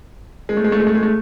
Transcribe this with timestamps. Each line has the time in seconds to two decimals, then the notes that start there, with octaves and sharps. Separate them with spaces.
0.49 G#3
0.57 A3
0.64 G#3
0.72 A3
0.80 G#3
0.87 A3
0.95 G#3
1.03 A3